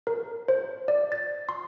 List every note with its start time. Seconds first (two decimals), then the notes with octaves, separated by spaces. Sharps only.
0.07 A#4
0.48 C5
0.88 D5
1.12 A6
1.49 C6